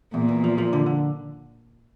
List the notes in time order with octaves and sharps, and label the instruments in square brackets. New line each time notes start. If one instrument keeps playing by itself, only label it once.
[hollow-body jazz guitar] E2 [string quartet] A#2
[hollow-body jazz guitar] E2
F3
F3
D3
D3